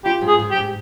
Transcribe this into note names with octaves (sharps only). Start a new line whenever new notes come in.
F4 G4
G#2
G#4
G#2
G4
G#2